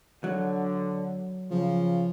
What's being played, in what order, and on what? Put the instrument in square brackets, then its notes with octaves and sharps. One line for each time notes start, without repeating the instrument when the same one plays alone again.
[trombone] D3 [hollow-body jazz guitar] F#3
[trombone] C#3 [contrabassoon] F3